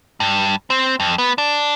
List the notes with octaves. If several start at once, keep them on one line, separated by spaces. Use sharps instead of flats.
G2
C4
F2
B3
D4